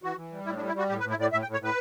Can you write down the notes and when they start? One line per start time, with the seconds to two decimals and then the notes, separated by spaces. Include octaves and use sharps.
0.03 E3 F#4
0.17 E3
0.32 G3
0.46 A2 E4
0.56 D4
0.61 G3
0.68 E4
0.75 G3 F#4
0.89 A2 G4
1.00 B4
1.04 A2
1.10 E4
1.17 A2 D5
1.32 A2 E5
1.42 G5
1.47 A2
1.53 C#5
1.60 A2 B4